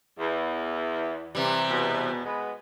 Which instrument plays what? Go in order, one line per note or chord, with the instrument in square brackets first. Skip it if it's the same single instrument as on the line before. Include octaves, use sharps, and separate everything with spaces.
[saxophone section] E2
[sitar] C3 E3 G3
[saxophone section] E2 B2
G#3 B3